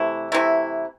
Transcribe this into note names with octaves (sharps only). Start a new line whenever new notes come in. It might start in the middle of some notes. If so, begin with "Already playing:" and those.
Already playing: C3 E3 A3 E4
C3 E3 A3 E4